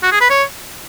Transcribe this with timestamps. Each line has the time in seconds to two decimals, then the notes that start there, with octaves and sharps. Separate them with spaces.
0.03 F#4
0.12 G#4
0.21 B4
0.30 C#5